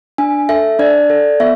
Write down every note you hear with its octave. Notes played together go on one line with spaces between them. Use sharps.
D4 G#5
A4 E5
D4 D5
A4
B3 E5